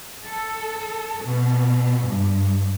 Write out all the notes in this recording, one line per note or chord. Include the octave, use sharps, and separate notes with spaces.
A4
B2
G2